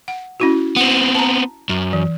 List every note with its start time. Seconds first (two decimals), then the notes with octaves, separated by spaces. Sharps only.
0.08 F#5
0.40 C#4 E4 F#4
0.76 B3 C4 F#5
1.15 A5 A#5
1.69 F#2
1.93 E3